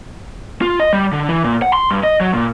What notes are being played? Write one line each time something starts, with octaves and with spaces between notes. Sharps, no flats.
F4
D#5
G3
D3
E3
A#2
F#5
C6
G2
D#5
F#3
A#2